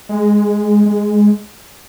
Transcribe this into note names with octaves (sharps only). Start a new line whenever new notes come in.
G#3
G#3